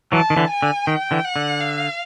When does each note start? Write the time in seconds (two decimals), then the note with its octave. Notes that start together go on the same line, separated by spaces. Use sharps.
0.12 E3 F#3 A5
0.30 D#3
0.36 D3 E3
0.50 G#5
0.62 D3
0.87 D#3 G5
1.11 D3 E3
1.24 F#5
1.36 D3
1.61 F5